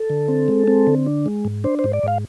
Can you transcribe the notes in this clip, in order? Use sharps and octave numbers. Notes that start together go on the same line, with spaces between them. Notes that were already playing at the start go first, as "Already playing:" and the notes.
Already playing: A4
D3
C4
G#3
C4
D3
D4
G#3
G#2
D4 C5
C5
G#2
D5
G#2 F5